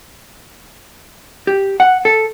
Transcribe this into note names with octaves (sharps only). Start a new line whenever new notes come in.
G4
F#5
A4